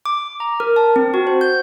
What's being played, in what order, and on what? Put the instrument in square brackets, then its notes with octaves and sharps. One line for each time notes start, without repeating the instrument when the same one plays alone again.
[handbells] D6
A#5
A#4
A5
C4
F#4
C5
G6